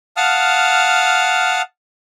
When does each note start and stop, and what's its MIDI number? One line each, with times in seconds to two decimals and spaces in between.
0.17 1.62 77
0.17 1.62 78
0.17 1.62 81
0.17 1.62 87
0.17 1.62 89